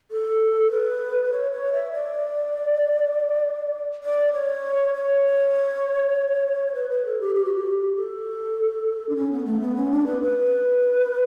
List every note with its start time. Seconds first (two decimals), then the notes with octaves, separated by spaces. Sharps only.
0.11 A4
0.71 B4
1.32 C#5
1.52 C#5
1.73 E5
1.92 D5
4.04 D5
4.33 C#5
4.94 C#5
6.74 B4
6.90 B4
7.05 A4
7.20 G4
7.35 G4
7.45 F#4
7.55 G4
7.96 A4
9.09 D4
9.16 C#4
9.32 B3
9.45 A3
9.61 B3
9.76 C#4
9.91 D4
10.06 B4
10.21 B4